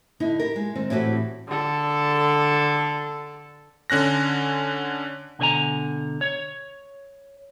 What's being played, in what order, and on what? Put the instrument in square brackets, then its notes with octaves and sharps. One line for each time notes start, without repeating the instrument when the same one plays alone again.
[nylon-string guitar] D3 D#4 E4
G4 A#4
G#3
D#3 C4
A2 E3 C4 F#4 G4
[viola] D3 A4
[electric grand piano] D3 C#4 F#6 A#6
[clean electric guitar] B2 D3 C#5 G#5 A#5
C#5